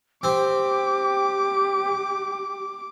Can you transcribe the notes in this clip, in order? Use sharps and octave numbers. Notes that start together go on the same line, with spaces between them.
C4 G4 D6